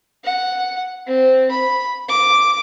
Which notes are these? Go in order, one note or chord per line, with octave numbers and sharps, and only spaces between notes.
F#5
C4
B5
D6